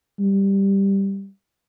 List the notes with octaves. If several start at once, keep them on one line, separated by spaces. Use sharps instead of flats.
G3